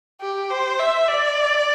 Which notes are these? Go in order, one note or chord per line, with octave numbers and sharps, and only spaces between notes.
G4
C5
E5
D5